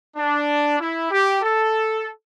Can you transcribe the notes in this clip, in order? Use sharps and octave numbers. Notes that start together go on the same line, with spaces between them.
D4
E4
G4
A4